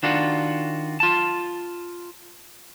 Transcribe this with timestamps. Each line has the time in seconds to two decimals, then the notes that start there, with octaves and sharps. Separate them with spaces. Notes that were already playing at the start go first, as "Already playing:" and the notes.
0.03 D#3 D4 F4 F#4
1.00 F4 A5